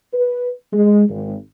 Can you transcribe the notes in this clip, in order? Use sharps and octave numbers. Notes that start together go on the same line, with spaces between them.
B4
G#3
G#1